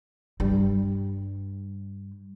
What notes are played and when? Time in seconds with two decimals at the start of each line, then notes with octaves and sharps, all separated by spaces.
0.40 G2 G3